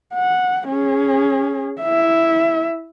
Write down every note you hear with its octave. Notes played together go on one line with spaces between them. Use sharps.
F#5
C#4 G#4
E4 E5